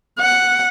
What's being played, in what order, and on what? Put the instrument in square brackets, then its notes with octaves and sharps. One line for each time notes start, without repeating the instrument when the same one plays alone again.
[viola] F#5